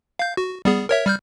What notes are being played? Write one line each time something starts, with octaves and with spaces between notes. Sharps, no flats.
F5 G6
F#4
G3 B3 G#4
A#4 C#5 E5
G3 F6 G6